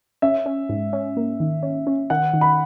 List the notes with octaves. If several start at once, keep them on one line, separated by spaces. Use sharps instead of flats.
C#4 E5
C#4
G#2
C#4
A#3
D#3
C#4
C#4
D#3 F#5
D#3
B5